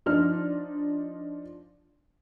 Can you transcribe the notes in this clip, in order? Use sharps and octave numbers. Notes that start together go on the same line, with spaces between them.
F3 D4 D#4 F6